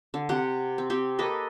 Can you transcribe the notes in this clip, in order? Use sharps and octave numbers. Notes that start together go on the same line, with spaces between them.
D3
C3 G4 F#5
C4
C4 G4
A#3 A4 B4 D#5